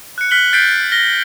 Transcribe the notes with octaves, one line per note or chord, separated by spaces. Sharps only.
F#6 C#7
F6 F#6 B6 F#7 G7
F6 G6 A6 B6 C7 D7
F6 A#6 G7